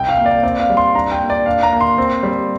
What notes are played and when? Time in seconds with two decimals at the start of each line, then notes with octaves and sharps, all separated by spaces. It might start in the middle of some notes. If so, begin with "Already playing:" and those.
Already playing: C2 G5
0.09 F5
0.18 A#3
0.26 D5
0.43 C4 D5
0.60 F5
0.70 G3
0.77 C6
0.94 D4 A#5
1.12 G5
1.21 A#3
1.30 D5
1.46 D4 F5
1.63 A#5
1.73 A#3
1.81 C6
1.98 C4
2.23 G3